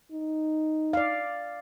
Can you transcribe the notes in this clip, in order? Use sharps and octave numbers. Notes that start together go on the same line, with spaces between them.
D#4
D5 F5